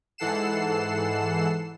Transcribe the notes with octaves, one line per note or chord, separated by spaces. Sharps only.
G#2 E3 A4 F#5 C7 E7